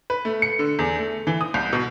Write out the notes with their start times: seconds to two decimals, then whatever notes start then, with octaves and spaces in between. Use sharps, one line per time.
0.10 B4
0.25 A3
0.42 C#7
0.59 D3
0.79 E2
0.99 A3
1.27 E3
1.41 D#6
1.54 C2
1.73 B2